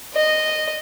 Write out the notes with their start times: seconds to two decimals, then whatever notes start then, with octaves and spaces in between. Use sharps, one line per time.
0.14 D#5